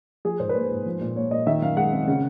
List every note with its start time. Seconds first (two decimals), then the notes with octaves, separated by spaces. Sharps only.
0.25 F3 G#4
0.40 G#2 C5
0.49 B4
0.55 A#3 C5
0.71 G#2
0.86 F3
1.01 A#2
1.16 A#3 C#5
1.31 A#2 D#5
1.47 D#3 E5
1.62 F#2 F5
1.77 G#3 F#5
1.93 C4
2.08 C#3